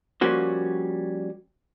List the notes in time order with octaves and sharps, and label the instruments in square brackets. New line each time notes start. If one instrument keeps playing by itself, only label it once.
[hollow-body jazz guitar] F3 G3 A#3 C#4 F#4 C5